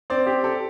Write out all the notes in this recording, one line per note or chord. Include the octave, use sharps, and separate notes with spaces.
C4 D5
G4
G4 A4